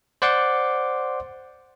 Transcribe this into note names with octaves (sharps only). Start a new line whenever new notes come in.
C5 D5 F#5 C6 D6